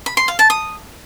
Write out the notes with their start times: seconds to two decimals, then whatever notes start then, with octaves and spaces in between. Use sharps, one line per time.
0.06 B5
0.17 C6
0.28 F5
0.39 A5
0.50 D#6